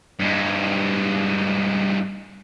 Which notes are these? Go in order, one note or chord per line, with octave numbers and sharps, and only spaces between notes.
G2 G#3